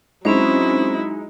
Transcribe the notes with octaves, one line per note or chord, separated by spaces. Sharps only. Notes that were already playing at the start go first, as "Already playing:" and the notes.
F#3 G#3 C4 C#4 D#4 E4 C5